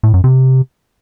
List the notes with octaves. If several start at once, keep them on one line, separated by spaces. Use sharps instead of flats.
A2
F#2
C3